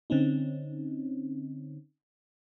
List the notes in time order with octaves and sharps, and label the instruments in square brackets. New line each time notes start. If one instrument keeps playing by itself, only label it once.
[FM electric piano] D3 C4 C#4 D#4